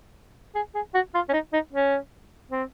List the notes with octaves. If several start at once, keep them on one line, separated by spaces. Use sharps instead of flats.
G#4
G#4
F#4
F4
C#4
D#4
D#4
C#4
C4